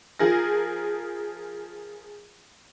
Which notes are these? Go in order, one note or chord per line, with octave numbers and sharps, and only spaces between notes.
F3 G#4 A#4 A#6